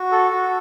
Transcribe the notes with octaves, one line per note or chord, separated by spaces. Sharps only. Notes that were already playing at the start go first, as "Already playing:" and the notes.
Already playing: F#4
A4
F#4